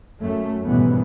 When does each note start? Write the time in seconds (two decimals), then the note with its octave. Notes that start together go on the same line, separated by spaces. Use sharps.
0.22 F#2 A3
0.64 G#1 F#2 B2 E3 G3 B3